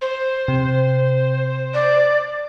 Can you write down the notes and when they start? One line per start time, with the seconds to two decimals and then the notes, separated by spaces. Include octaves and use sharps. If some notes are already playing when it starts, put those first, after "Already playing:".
0.02 C5
0.48 C3
1.74 D5